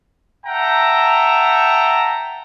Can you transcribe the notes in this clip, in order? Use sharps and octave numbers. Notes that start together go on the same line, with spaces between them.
E5 F#5 G5 A5 A#5